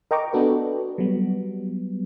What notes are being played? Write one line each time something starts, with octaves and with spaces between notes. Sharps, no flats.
A#4 D#5 G5 A#5 C#6 D6
B3 D4 F#4 A4 B4
F#3 G3 B3